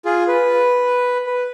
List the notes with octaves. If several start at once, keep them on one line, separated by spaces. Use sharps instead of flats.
F4 G#4
B4
B4